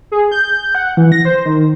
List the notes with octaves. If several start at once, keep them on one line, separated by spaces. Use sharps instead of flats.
G#4
G6
F#5
E3
A#6
C5
D#3